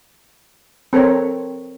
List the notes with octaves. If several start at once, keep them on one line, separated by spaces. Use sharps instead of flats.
C4 A4 A#4 C#5